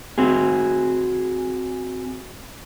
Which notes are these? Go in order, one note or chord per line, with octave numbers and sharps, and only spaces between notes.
C4 F#4 G#4